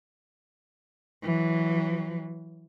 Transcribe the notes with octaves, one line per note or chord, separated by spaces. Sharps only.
E3 F#3